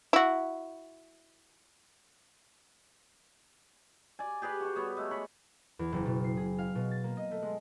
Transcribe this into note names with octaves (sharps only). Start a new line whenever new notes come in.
E4 F#4
D5 G#5
G4 G#4 B4 D5
F#4 C#6
G3 B3 C#5
G#3 A3
C#5 B5
E2
F#1
B2
C7
G#4
F5
B2
A6
A#3
D#5
A3
G#3